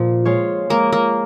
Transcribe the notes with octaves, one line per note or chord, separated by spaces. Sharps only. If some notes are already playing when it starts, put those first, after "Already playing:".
Already playing: A#2 F3 F4
G#3 F4 C#5
G#3 A#3
A#3